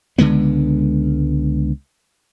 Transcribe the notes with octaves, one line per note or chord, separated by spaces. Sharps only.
C#2 D3 G#3 B3